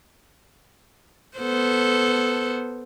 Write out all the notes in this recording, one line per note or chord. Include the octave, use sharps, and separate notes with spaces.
B3 A4 C5